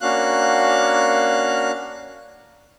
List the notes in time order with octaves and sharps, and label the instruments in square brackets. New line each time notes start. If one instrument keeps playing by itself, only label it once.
[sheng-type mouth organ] A#3 C#4 D4 F#4 F5 F#6